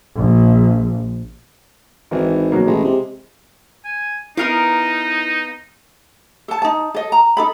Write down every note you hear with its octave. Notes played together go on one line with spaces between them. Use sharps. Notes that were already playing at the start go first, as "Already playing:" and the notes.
A#1
G#1 D#3 E3
B2 F#3 A#3
A1 G#3
C3
G#5
B3 D#4 E4 A#4 F5
A4 A5
D#4 A5
A4 D#5
A#5
D#4 A4 B5